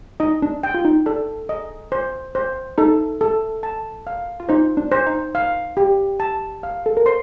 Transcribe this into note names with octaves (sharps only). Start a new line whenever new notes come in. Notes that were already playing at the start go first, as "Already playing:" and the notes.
D#4 D#5
D4
G5
F4
D#4
D4 A4
D#5
C5
C5
D#4 A4
A4
A5
F5
F4
D#4 C5
D4
C5
D#4
F5
G4
A5
F5
A4
A#4
C5 C6